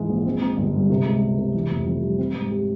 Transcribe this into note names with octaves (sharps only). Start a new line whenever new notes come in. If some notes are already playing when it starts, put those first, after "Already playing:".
Already playing: C#2 G#2 E3 G#3
A#1
C4
C4
G1
G2
C3
C#2
C#2
C3
E3
F1
F2
G3
C4
G#2
G4